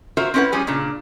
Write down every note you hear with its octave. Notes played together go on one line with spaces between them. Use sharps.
F4 F#4 A#4 C5 E5
C4 C#4 E4 A4 B4 F#5
F3 G3 C#4 G#4
A#2 C#3 D4